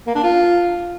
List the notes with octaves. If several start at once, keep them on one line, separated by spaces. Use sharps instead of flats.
A#3
D4
F4